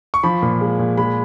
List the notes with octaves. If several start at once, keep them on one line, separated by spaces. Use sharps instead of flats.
C#6
F3 B5
A#2
G#3
A#2
G#3 B5